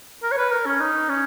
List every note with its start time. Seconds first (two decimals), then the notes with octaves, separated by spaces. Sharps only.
0.23 A#4
0.31 C#5
0.37 B4
0.51 A#4
0.66 C#4
0.80 D#4
1.09 C#4